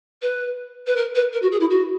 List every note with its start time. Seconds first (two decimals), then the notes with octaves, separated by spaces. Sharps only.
0.22 B4
0.86 B4
0.96 A#4
1.15 B4
1.32 A#4
1.42 F#4
1.51 G#4
1.60 E4
1.70 F#4